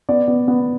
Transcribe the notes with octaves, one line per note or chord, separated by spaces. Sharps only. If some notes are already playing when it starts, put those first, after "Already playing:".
B3 D5
B3
B3